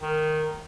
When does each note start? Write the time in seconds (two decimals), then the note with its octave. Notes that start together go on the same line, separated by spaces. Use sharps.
0.02 D#3